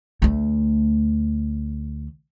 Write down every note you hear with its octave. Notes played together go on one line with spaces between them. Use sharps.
D2 A3